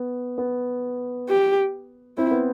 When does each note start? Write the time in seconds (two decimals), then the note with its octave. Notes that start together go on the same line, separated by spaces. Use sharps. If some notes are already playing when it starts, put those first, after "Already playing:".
Already playing: B3
0.38 B3
1.29 G4
2.17 C4 E4
2.31 B3